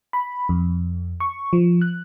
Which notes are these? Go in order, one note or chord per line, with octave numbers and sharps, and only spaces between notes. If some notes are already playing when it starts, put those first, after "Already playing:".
B5
F2
C#6
F3
F#6